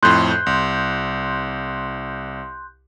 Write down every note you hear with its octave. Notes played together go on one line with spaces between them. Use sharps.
F2 A2 C6 F#6 G6
C2